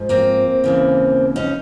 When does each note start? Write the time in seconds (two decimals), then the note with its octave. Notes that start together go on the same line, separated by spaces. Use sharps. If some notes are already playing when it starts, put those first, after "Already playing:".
Already playing: G#2 F3
0.09 A#3 C4
0.64 D#2 C#3 E3
1.36 C#4 D#4